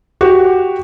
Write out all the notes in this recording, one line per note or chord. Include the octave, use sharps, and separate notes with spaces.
F#4 G4